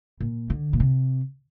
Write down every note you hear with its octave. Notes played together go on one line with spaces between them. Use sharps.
A#2
D3
A#2
C3